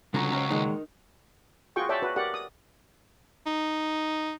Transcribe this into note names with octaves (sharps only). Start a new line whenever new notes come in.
C#2 D3 F#3 G3 C#4 F4 A#5
C#4 C5 A#5
A#2 D#3 G#3 D#4 A#4
F4 F#4 G#4 G5 C#6
C#5 D5 E5 G5 A5
F#4 B4
G4 A#4 D5 F#5
D#6
D#4